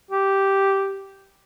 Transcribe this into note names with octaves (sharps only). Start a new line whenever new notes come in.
G4